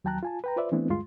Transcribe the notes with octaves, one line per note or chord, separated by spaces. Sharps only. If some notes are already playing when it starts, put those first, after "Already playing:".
D#2 F#3 G5 A5 A#5 F#6
F4 G#5 A5
B4 G5 A#5
F4 B4 C5 D5 E5
E3 A3 B3 C4 D4 E4
D2 G2 G#3 F4 C6